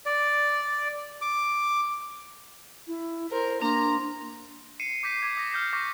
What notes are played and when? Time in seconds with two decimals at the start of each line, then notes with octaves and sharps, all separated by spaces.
0.06 D5
1.22 D6
2.87 E4
3.31 A#4 C5
3.62 A#3 D4 A#5 C6
4.80 C7 C#7 D#7 E7
5.03 D6 G6 B6 C7 D#7
5.22 D6 G#6
5.37 D#6 A#6
5.51 F6 G6 A#6 C7
5.73 C#6 D6 F6 G6 A#6 B6